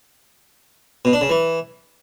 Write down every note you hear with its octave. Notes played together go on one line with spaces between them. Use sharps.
B2
D4
C#3
E3